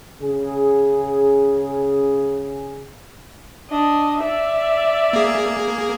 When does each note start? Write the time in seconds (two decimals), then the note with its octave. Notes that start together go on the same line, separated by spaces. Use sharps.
0.21 C#3 G#4
3.70 D4 D#5
4.20 D5 E5
5.13 A#3 G#4